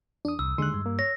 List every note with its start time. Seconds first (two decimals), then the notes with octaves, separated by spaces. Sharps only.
0.25 E2 D4 D#6
0.39 C2 E6
0.58 D#2 D3 G#3 C6 F#6
0.74 G2
0.86 A#3
0.99 C#5 A#6